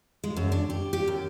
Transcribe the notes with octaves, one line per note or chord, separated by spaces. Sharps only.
G#3
F#2
D4
G4
G4
F#2